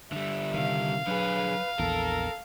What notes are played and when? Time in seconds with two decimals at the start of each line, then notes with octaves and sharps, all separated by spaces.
0.13 D3 G3 E5
0.54 C3 D#3 F5
1.07 D3 F#3 G#4 B4
1.79 A#1 E2 A4 A#4